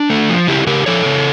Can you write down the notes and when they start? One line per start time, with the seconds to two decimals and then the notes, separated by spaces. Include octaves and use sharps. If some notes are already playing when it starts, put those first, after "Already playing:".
Already playing: D4
0.10 A3
0.29 F3
0.47 C#3 E4 G4
0.67 C#3 G4 A#4
0.86 F3 A4 C#5
1.06 C#3